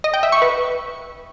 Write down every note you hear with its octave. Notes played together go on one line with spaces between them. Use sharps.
D#5
G5
E5
C#6
B4